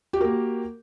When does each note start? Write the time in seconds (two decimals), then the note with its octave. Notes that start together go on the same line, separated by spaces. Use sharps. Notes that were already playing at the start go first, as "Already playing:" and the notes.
0.13 G4
0.17 F#4
0.21 A#4
0.24 A#3